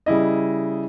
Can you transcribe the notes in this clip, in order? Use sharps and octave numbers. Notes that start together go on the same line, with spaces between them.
C#3 G3 E4 D#5